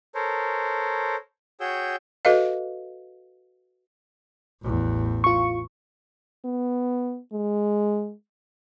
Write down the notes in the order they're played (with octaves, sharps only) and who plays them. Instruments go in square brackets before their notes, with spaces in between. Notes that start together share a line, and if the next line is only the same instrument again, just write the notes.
[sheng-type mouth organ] A4 A#4 C5 C#5
F#4 G#4 C#5 G5 E6 G6
[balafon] F#4 A4 B4 D#5 F5
[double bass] A1 E2
[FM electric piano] F4 C#6
[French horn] B3
G#3